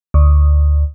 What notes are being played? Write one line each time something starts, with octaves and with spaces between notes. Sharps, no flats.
D2